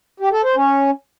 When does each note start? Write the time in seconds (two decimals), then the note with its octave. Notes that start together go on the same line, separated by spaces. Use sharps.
0.20 G4
0.32 A4
0.44 C5
0.55 C#4